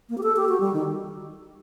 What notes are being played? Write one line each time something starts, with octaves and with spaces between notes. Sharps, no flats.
A#3
G4
A4
G4
F#4
G3
D#3